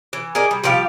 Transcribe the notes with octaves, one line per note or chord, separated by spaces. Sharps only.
E3
G#4 A#4 D5 D#5
G3
F3 G3 G4 F5